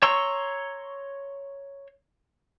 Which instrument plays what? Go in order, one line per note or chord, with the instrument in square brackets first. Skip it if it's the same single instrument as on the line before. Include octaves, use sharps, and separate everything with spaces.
[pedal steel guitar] C#5 A#5 C6 C#6 E6